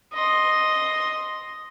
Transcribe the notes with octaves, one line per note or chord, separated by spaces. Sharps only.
D#5 C6